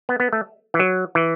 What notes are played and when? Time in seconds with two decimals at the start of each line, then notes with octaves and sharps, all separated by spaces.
0.09 B3
0.20 B3
0.33 A3
0.74 E3
0.79 F#3
1.15 E3